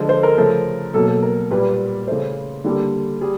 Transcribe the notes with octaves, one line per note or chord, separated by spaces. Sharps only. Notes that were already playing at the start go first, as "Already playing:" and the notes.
Already playing: D3 F3 G#3
C5
A#4
C#3 F3 A3
B2 F#3 A#3 A4
A4
A#4
A#2 G3 A#3 B4
C#3 E3 A3 C5
D3 G3 A#3
G3 G#4